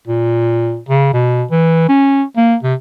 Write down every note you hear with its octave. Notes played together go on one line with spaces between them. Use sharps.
A#2
C#3
B2
E3
C#4
A#3
C3